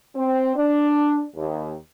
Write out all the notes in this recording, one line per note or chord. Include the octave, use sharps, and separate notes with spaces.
C4
D4
D#2